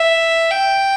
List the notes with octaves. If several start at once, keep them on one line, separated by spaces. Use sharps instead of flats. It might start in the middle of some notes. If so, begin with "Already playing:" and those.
Already playing: E5
G5